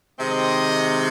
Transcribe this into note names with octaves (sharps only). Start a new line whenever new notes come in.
C3 D#3 G#3 C4 D#5